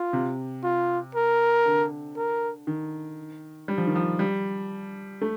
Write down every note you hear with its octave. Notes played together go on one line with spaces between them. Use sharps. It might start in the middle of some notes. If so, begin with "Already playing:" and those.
Already playing: F4
C3
F4
A#4
D3
A#4
D#3
G3
F3
D#3
F3
G3
A3